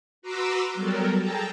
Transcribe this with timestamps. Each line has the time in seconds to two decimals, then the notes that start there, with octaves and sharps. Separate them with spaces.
0.22 F#4 B4 A#5 C6 D6 E6
0.74 F#3 G3 B3 A4 A#4
1.19 G#4 A4 G5 A5 A#5